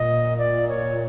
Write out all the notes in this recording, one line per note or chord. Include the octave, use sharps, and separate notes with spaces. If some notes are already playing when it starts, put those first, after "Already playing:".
Already playing: A#2 D#5
D5
C#5